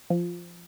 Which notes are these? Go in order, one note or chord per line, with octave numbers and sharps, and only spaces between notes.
F3